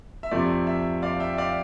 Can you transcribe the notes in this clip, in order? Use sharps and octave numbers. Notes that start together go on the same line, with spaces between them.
E5
F2 C3 F3 A3 D5
E5
D5 F5
E5 G5
D5 F5